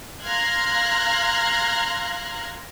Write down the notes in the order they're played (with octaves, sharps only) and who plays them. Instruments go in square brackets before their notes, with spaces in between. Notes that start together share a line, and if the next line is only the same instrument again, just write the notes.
[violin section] F5 A#5 C6 F6 F#6 G#6